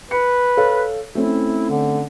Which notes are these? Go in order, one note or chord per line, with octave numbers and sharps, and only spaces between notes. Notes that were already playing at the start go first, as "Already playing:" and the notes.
B4 C#7
A4 C#5 F5
A3 C4 C#4 E4
D3